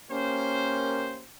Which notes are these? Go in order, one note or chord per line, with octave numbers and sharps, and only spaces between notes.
A#3 C#4 G4 A#4 C5